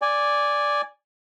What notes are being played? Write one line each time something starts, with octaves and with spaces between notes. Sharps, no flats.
D5 G#5